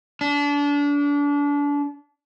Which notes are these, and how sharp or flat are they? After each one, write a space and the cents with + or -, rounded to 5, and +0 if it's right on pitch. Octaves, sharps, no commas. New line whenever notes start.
D4 -30